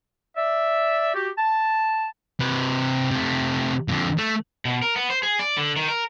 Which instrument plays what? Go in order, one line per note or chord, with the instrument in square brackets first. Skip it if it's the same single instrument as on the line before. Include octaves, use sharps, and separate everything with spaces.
[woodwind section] D5 E5
F#4 G4
A5
[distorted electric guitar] C3 B4
C3 A3
F2 D3
A3
[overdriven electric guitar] B2
A#4
B3
C5
G#4
D5
D3
D#3
A#4